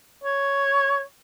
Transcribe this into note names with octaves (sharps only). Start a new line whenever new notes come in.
C#5